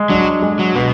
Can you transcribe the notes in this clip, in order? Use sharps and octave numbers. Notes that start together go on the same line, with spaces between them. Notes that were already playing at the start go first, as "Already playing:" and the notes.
Already playing: G#3
F#3 D4
G#3
F#3
B2 B3